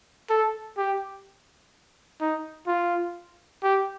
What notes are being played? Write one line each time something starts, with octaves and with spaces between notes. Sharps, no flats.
A4
G4
D#4
F4
G4